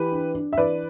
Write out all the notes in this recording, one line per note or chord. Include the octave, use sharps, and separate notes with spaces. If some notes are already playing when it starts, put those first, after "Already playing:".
Already playing: E3 G4 B4
D4
D4
E5
E3 B4 D5